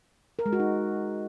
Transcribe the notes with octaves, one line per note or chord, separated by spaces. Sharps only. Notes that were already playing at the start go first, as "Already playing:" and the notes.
A#4
G#3
F#4
D#4